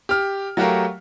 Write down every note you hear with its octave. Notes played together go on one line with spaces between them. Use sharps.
G4 F6
F#3 A3 F#4 G4 A#4 F5